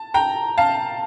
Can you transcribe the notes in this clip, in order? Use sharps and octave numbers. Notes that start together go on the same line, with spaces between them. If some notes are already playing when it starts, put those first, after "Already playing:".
Already playing: A5
G5 A#5
F5 A5